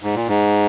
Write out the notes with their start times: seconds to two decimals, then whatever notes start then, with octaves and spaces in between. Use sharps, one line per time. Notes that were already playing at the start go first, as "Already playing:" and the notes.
0.03 G#2
0.15 A#2
0.28 G#2